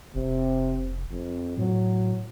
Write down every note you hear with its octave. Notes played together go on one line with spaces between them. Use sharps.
F1 C3
F2
A2 F#3